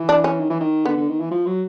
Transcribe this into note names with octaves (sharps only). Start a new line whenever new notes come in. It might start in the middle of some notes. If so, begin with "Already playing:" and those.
Already playing: E3
D4
C#4
D#3
E3
D#3
D3 B3
D3
D#3
E3
F3
F#3